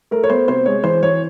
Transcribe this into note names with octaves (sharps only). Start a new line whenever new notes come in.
A3 A#4
C#5
B3 C5
C3 C5
G#3 C#5
E3 C5
E3 C#5